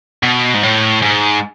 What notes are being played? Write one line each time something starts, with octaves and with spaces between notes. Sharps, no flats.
B2
G#2
A2
G#2